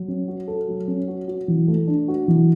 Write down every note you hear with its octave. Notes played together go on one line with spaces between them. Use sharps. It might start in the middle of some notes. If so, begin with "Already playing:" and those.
Already playing: F#3
C#4
F#4
A4
F#3
C#4
F#4
F#4
E3
A3
D4
F#4
E3